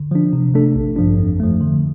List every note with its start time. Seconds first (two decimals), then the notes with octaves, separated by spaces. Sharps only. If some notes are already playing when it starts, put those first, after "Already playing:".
Already playing: D3
0.11 F3 D4
0.33 C3
0.54 A3 D4 A4
0.75 A1
0.96 G2 F3 D4
1.18 F2
1.40 F3 A3
1.61 D3